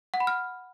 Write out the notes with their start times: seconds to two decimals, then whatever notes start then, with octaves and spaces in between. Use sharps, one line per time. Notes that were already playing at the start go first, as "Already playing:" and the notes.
0.14 F#5
0.20 B5
0.27 F6